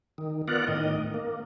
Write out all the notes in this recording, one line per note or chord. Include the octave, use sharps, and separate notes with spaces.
D#3
B3 F4 A#4 D5 F#5
A2 D#3 D#5
A#3